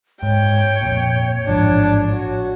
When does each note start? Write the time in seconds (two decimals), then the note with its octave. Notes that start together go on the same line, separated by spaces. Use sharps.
0.23 G#2 C#5 G5
0.82 F2 A#2
1.47 A1 G#2 F3 D4
2.11 F#4